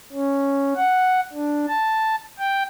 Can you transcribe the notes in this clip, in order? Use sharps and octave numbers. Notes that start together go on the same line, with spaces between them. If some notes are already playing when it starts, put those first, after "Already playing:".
C#4
F#5
D4
A5
G5